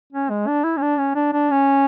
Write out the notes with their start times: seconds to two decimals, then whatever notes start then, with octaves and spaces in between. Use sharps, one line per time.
0.13 C#4
0.30 G#3
0.47 D4
0.64 E4
0.77 C#4
0.82 D4
0.99 C#4
1.15 D4
1.33 D4
1.50 C#4